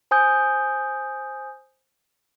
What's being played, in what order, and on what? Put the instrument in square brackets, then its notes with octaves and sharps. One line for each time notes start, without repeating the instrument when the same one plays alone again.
[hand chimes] C5 G#5 D#6 G6